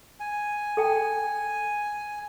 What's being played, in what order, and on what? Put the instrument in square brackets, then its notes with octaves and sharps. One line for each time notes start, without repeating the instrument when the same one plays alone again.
[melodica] G#5
[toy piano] A4 G5 A5